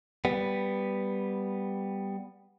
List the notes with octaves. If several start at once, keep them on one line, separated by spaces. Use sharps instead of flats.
G3 B3